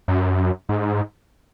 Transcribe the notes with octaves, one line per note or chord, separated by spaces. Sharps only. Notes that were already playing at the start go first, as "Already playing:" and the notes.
F#2
G#2